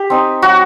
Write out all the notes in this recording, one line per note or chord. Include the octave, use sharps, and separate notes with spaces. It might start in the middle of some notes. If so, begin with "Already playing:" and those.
Already playing: G4
C4 D#4
F#3 F#4